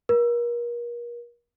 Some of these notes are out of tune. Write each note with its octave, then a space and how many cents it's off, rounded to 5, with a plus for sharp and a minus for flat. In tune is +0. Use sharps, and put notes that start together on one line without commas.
A#4 +35